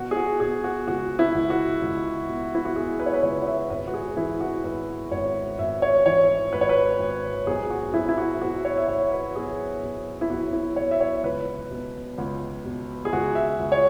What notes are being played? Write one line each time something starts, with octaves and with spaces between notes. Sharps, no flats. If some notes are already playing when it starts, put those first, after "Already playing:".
Already playing: B2 F#4
G#4
F#4
B2 G#4
F#4
C#2 F#4
E4
C#2
F#4
C#2
B2
E4
F#4
B2 G#4
B4
C#5
B4
C#2 C#5
C#5
E5
G#1 B4
F#4
G#4
E3 E4
F#4
G#1 B4
G#1 C#5
G#1 E5
C#5
E3 C#5
G#1 B4
C#5
B4
G#1
B1 G#4
F#4
B1 E4
E4
F#4
B2 F#4
C#5
E5
B1 C#5
B4
B2 G#4
B2
E4
B1 F#4
E4
B2 C#5
E5
C#5
C#2 B4
B2
C#2
B2
G#4
C#2 F#4
E5
C#2
C#5